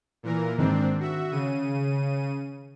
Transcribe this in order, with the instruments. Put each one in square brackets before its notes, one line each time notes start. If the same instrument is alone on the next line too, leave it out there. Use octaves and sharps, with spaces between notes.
[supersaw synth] A#2 E3 A#4
[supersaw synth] G#2 C4 D4 [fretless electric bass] D#3
[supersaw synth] F#4 E5
C#3 D#7